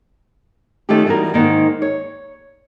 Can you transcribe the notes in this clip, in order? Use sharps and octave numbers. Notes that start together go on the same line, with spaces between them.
D#3 A3 C#4 F4 G4
E3 G3 B3 F#4 A#4
G#2 D#3 A#3
C#5